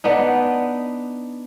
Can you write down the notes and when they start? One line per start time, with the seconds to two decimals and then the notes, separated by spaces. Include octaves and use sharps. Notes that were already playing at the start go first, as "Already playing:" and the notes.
0.04 B3 D4 D#4